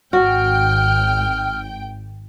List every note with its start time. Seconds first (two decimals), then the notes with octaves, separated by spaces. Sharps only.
0.13 G#1 F#4 G5 F6